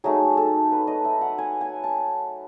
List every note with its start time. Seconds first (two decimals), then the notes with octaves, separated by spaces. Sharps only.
0.04 F#3 A3 D#4 G#4
0.37 A4
0.72 B4
0.87 D#5
1.05 E5
1.21 F#5
1.38 G#5
1.61 G#5
1.84 A5